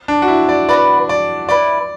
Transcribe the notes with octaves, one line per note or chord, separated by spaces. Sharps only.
D4
F#4
E4
D5
B3 F#4 B4 D5
D5
C#4 E4 B4 D5